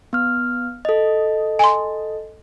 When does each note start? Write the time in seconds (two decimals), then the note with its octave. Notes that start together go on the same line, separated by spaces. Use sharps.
0.13 B3 F6
0.85 A4 D#5
1.59 G#5 C6